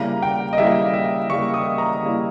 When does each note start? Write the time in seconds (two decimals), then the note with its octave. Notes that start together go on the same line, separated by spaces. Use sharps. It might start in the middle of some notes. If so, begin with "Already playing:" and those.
Already playing: C#3 G3 A#3 E4 A#5
0.23 G5
0.53 D#5
0.58 C#3 G3 A#3 E4 E5
0.94 E5
1.30 C#3 G3 A#3 E4 C#6
1.54 D#6
1.78 A#5
2.03 C#3 G3 A#3 E4